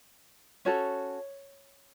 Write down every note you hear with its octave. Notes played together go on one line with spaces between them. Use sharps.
C#4 F#4 A4 C#5